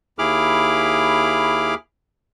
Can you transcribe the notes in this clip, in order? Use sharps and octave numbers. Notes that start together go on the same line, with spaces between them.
D#2 E4 G#4 B5 D6 F6